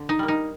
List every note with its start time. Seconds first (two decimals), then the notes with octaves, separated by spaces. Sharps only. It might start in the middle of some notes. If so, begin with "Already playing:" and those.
Already playing: D3
0.09 D#4
0.19 G3 A#3
0.28 D#4